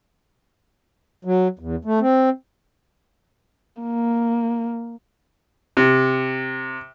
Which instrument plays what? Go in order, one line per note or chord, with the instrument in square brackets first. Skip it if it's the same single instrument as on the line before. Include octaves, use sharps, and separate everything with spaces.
[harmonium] F#3
E2
A3
C4
[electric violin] A#3
[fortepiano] C3